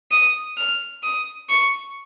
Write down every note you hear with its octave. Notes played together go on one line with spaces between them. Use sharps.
D#6
F6
D#6
C#6